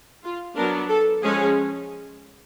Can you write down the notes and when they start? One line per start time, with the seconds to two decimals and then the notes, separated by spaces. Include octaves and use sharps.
0.24 F4
0.56 F#3 B3 D4 A#4
0.89 A4
1.22 F3 G#3 C#4 G#4